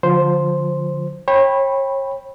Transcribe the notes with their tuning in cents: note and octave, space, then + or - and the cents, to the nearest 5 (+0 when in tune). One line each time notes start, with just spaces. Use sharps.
D3 +0 F3 +25 C5 +0
C#5 -35 G5 +15 B5 +0